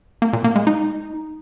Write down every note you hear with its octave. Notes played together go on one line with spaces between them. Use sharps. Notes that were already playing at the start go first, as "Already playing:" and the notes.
A#3
A#2
A#3
G#3
D#4